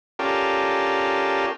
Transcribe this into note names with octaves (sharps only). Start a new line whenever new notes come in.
C#4 F4 G4 A4 A#4 D5